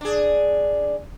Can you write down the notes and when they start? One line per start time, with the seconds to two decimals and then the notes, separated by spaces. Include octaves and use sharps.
0.01 D4 G#4